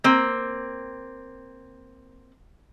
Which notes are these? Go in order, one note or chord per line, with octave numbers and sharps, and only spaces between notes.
A#3 C4